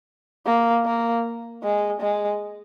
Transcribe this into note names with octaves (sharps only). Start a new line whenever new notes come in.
A#3
A#3
G#3
G#3